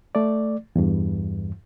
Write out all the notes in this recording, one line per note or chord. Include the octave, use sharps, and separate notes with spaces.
A3 D5
E2 G2